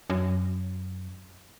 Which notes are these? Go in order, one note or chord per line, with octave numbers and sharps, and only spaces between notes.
F#2